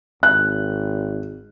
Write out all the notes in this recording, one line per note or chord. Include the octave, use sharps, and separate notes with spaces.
G#1 F#6